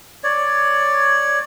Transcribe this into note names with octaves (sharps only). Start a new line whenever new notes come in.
C#5 D5